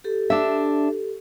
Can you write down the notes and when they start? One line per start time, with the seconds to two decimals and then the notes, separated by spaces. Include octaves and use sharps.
0.04 G4 A4
0.30 D4 E5